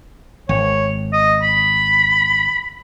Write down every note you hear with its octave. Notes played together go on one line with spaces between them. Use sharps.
G#1 C#5
D#5
B5